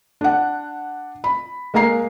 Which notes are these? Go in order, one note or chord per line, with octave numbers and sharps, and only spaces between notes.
D4 F#5
B5
G#3 A#3 F5 A#5 C7